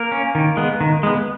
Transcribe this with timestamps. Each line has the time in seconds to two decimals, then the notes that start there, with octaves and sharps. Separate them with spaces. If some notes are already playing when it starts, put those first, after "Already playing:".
Already playing: A#3 A#4
0.12 C#4
0.35 D#3
0.57 G#3 B3
0.81 D#3
1.03 G#3 B3